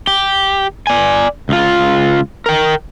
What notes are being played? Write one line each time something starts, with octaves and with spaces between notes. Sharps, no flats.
G4
D5 G#5
C#2 F4
A#4 G5